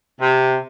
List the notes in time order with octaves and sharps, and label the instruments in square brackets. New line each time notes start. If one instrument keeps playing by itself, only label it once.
[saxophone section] C3